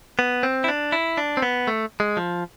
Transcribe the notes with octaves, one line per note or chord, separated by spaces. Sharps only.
B3
C4
E4
D4
E4
D4
C4
B3
A3
G#3
F3